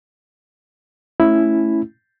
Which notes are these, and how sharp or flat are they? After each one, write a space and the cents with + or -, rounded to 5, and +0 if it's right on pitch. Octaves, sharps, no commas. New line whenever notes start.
A3 +0 C#4 +0 E4 +0